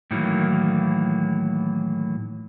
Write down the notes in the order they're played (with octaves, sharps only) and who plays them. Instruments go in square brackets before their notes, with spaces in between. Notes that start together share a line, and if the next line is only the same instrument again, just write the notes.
[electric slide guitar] A2 D#3 E3 F#3 A#3